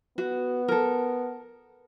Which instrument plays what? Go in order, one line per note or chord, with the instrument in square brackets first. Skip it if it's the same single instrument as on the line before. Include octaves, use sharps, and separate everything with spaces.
[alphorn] B3 [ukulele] F#4
[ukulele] A4 A#4